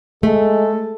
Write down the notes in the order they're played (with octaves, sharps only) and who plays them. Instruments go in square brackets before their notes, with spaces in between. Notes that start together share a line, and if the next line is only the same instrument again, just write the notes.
[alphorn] G#3 [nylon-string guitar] A3 [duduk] A4